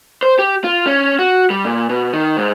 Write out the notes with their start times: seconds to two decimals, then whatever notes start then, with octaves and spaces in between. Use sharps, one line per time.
0.23 C5
0.39 G4
0.64 F4
0.87 C#4
1.19 F#4
1.50 G3
1.65 A#2
1.89 B2
2.13 D#3
2.37 G#2